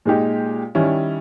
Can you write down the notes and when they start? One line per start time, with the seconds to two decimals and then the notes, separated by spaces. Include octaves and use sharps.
0.05 A#2 G#3 D#4 G4
0.75 D#3 G3 C#4 E4